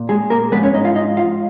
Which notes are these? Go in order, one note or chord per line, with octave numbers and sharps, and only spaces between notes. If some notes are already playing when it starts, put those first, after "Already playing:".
Already playing: A#2
G#3 G#4
A#3 A#4
G#2 F3 G#3 B3 B4
C#4 C#5
D#4 D#5
F4 F5
D#4 D#5
F4 F5